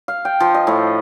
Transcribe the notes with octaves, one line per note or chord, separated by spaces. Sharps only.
F5
G5
F3
D#5
A2